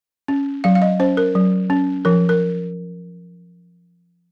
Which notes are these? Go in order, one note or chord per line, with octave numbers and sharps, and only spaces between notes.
C#4
F#3 F5
F5
D#5
C#4 C5
A#4
F#3
C#4
F3 A#4
A#4